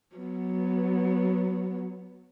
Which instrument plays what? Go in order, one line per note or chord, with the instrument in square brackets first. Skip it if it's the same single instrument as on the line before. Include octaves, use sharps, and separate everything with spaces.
[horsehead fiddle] F#3 B3